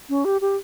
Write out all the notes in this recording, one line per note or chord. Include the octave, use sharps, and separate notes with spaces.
C#4
G4
G4